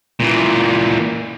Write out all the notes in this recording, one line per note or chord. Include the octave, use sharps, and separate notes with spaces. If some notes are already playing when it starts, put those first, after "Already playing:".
A#2 E3